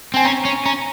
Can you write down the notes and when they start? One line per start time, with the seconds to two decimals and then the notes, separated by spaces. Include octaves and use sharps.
0.14 C4 G#5
0.25 C#4 A#5
0.45 C#4
0.66 C#4 A#5